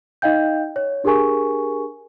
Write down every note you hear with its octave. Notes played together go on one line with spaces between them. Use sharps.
D#4 D#5 F5 G5 G6
C#5
D4 G4 G#4 A#4 G#5 C#6